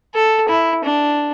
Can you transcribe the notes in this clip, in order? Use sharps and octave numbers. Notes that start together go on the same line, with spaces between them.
A4
E4
D4